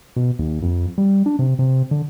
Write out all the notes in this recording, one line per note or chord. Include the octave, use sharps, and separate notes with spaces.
B2
D#2
F2
G3
D4
C3
C3
D3